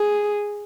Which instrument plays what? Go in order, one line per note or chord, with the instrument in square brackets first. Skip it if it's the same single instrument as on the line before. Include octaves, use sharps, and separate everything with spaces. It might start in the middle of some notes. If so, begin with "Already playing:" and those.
Already playing: [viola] G#4